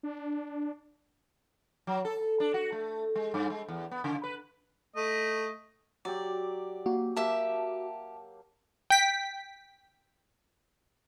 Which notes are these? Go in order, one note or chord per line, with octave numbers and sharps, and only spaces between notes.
D4
F#3
A4
D4
F#4
A3
G#3
G2
G#3
E2
B3
C#3
B4
A3 D#5
F#3 G4 D5
A#3 F#4
A#3 G4 E5 A5
G5 B6